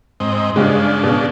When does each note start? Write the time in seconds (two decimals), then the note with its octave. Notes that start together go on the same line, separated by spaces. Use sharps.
0.20 G#2 C4 D#5
0.56 G2 C#3 G#3 D4
1.03 B2